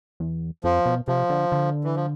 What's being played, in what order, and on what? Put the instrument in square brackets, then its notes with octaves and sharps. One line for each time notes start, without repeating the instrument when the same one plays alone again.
[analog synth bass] E2
[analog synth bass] F2 [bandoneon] F3
[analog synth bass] B2
[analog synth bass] C3 [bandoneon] F3
[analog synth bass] D3
D3
[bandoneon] E3
F3